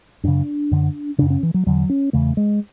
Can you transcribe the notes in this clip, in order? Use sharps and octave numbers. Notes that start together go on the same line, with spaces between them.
F#2 C#3 D4
F#2 D3
F#2 C#3 D4
C#4
E3
F#3
E2 D3 F#3
C#4
E2 C#3 A3
G#3